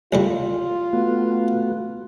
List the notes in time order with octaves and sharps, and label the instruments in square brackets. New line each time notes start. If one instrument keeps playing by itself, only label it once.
[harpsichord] C2 F2 G3 [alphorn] F4
[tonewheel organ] A3 B3 F#4